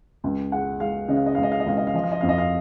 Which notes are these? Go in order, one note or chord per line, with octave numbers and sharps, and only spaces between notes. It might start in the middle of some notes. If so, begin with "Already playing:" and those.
C#2
G#3 F#5
G#3 F5
C#3 D#5
F5
D#5
C#2 F5
D#5
F5
D#5
C#2 F5
D#5
F5
F3 D#5
F5
D#5
F2 F5
D#5
F5